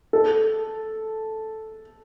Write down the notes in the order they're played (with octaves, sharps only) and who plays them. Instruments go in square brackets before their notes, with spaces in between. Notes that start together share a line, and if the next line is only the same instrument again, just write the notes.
[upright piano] A4